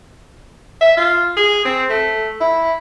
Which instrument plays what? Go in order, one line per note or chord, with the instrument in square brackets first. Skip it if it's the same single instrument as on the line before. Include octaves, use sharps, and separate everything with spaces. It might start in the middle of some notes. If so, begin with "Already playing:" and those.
[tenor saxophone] E5
F4
G#4
C4
A3
E4